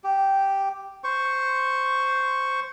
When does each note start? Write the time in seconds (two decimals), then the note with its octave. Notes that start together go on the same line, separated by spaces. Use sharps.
0.04 G4
1.04 C5 C#6